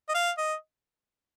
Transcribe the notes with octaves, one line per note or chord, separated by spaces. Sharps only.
D#5
F5
D#5